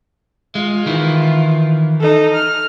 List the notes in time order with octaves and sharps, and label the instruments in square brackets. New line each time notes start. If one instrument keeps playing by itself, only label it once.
[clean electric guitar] G#3 [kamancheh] F4
[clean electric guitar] D#3 E3 E4
[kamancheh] D#4 A4
F6